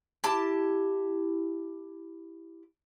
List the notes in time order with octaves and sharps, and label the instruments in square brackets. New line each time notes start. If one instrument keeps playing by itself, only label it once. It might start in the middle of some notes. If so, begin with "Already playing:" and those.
[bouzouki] E4 G4 A5